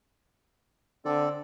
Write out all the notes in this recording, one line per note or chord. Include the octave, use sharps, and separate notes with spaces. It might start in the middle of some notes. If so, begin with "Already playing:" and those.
D3 C4 A4 D5